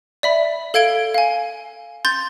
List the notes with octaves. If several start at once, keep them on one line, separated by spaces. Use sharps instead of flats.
D5 E5 B5
A4 F5 G#6 D7 G7
F5 G#5
C6 G6 A6